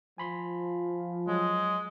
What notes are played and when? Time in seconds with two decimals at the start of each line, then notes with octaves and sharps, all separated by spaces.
0.18 F3 G#5 B5 C6
1.28 F#3 G#3